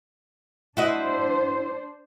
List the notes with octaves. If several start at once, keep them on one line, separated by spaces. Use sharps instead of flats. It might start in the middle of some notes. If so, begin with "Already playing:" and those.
D4 E4 F#4 C5 D#5